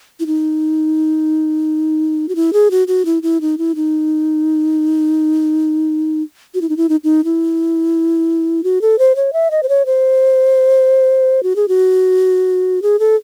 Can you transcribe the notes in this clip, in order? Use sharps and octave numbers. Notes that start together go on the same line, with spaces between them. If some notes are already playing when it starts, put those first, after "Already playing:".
E4
D#4
F#4
E4
G#4
F#4
F#4
E4
E4
D#4
E4
D#4
F#4
E4
D#4
E4
D#4
D#4
E4
F#4
A4
C5
C#5
E5
D#5
C5
C#5
C5
F#4
G#4
F#4
G#4
A4